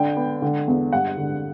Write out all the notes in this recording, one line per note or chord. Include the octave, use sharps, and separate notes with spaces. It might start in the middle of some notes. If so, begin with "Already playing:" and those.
Already playing: D3 D4 G5
B3
D3
E2
G2 F#5
D3